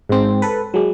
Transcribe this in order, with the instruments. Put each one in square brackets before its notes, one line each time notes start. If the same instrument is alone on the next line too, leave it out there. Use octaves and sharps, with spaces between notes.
[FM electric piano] G#2 C4
A4 B4
F#3 G#3